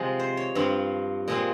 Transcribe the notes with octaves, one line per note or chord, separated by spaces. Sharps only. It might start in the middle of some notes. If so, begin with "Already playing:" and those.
Already playing: C3 F3 G#3 D#5 F5
C5
C#5
G2 F3 C4
A#2 F3 G#3 C4 D#5